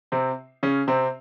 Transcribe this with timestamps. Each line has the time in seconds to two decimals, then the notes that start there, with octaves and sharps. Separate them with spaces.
0.12 C3 C4
0.63 C#3 C#4
0.88 C3 C4